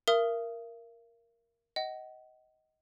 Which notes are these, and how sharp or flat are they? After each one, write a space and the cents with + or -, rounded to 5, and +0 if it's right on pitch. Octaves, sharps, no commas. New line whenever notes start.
A#4 +0 E5 +45 D#6 +0
D#5 +15 F#5 +35